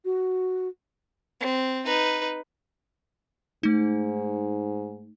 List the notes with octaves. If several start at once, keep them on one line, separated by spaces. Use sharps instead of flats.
F#4
C4
D#4 B4
G#2 A3 D#4